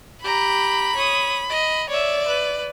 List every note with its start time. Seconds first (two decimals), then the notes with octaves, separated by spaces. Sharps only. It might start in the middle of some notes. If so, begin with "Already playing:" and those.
0.24 G4 A#5 B5
0.96 C#5 D#6
1.50 D#5
1.89 C#5 D5 E5
2.27 B4